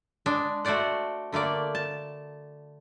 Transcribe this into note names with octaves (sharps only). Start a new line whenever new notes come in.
G#3 D4
A3 F#4 C5 D5 F#5
D3 A3 A#3 D5
A5